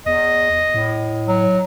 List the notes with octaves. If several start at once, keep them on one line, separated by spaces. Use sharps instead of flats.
E2 D#5
A2
F#3